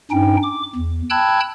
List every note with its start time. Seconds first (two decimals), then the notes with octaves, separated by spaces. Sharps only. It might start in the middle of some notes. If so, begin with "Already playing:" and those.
0.11 G2 C#4 D#4 G5
0.43 D6
0.75 E2
1.10 G5 A5 B5 E6 F#6 G#6